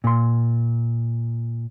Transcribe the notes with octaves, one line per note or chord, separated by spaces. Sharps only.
A#2 C6